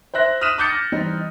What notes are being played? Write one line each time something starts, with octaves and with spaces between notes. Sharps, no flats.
C5 E5 F#6 A#6
D#6 F6 F#6 B6 D#7 E7
D6 D#6 G6 A6 C#7
A#6
E3 G3 C4 D#4